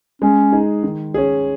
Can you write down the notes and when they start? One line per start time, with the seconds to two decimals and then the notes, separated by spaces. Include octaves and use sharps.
0.22 G#3 C#4
0.52 D#4 G#4
0.83 D#3
1.14 C#4 G#4